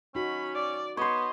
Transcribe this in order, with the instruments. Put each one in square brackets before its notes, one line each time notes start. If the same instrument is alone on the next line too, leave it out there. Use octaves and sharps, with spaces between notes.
[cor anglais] C#4 [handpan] D#4 F#4 [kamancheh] B5
[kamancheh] D5 D6
[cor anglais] B3 [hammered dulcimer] C5 C#5 [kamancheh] D#5